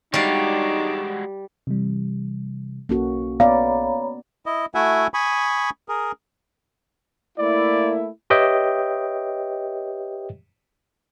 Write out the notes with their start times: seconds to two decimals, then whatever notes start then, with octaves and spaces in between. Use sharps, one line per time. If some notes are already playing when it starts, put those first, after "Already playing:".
0.14 G3 G#3 D4 D#4 F#4 C#5 D5 F5
1.67 C3 E3 G3
2.89 B1 A#3 C#4 F#4 A4
3.40 B3 C#5 D5 F5 A#5 B5
4.46 E4 D#5
4.75 A3 E4 F#4 E5 F#5 G#5
5.14 G#5 B5 C#6 D#6
5.89 G#4 A#4
7.38 A3 A#3 E4 D5
8.30 G4 B4 C#5 D#5 E5 G5